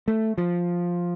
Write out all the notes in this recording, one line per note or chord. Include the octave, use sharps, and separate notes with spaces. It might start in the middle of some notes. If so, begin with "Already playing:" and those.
A3
F3